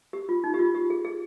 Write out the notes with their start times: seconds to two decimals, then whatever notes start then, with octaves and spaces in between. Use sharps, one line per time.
0.13 G4
0.29 F4
0.44 D#4
0.54 G4
0.59 F4
0.75 G4
0.90 G#4
1.05 G#4